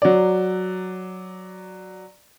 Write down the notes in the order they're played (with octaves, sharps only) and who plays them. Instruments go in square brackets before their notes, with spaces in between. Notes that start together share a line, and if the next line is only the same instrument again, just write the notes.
[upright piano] F#3 D5